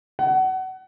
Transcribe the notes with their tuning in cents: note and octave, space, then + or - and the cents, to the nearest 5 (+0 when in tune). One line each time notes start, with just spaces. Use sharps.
F#5 +25